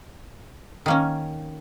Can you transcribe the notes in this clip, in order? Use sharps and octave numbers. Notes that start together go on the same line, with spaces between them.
D#3 A#3 C#4